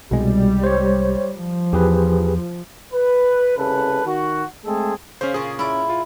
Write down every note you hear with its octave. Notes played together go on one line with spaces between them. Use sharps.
C2 B2 G3 G#3
C5 C#5
F3
E2 G4 G#4 B4
B4
C2 C#3 A4 B4
D#3 F#4
G#3 A3 C4 G#4 A4
C#3 C#4 C5
A#2 C#3 G#4
C#4 E4 D5
F4